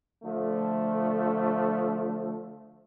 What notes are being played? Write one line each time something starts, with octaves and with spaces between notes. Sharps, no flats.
D3 F3 A3